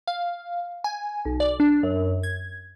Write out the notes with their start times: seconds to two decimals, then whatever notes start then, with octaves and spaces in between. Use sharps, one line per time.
0.07 F5
0.84 G#5
1.25 B1
1.40 D5
1.60 D4
1.83 F#2
2.23 G#6